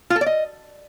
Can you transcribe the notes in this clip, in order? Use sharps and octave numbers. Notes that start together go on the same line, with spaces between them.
F4
A4
D5
D#5